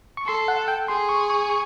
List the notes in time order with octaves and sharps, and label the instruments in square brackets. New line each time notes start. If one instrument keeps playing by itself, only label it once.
[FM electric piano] C#6
[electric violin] A4 [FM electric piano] C6
[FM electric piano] F#5
G5
[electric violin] G#4 [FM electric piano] C6
[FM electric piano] C#6
C#6
C#6